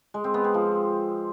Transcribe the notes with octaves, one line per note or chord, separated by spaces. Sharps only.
G#3
C4
B3
C4
F3